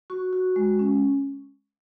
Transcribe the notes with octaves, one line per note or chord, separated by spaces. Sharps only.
F#4 C#6
F#4
G#3
C#4